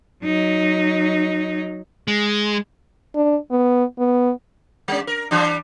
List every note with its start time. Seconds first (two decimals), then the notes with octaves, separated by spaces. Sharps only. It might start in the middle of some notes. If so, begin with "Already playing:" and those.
0.24 F#3 D#4
2.08 G#3
3.15 D4
3.51 B3
3.98 B3
4.88 G3 C#4
5.07 A#4
5.31 E3 G3 D4